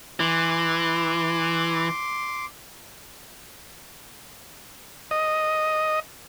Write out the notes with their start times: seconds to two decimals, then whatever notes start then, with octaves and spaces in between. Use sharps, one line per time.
0.20 E3 C6 D6
5.11 D#5